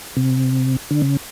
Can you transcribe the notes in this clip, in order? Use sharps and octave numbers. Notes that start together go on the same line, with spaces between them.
C3
D3
C#3